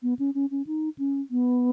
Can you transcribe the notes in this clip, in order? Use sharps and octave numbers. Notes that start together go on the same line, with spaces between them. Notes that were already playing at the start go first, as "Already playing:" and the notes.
B3
C#4
C#4
C#4
D#4
C#4
B3